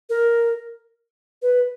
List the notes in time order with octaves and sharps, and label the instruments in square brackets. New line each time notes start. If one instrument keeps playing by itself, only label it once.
[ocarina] A#4
B4